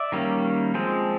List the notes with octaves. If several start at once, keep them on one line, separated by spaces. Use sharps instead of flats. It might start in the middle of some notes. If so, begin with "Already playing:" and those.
Already playing: D5 E5
D#3 G3 A#3 C#4
F3 G#3 C4